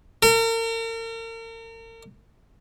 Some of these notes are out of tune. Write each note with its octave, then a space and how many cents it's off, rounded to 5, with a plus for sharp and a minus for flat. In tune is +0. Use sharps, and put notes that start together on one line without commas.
A#4 -40